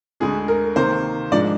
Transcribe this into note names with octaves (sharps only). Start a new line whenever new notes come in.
D2 D3 G#3 G#4
A#4
C3 D#3 A#3 C5
G#2 F3 G#3 D4 D5